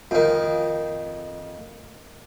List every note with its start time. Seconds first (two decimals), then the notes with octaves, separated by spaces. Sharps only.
0.11 F2 D#3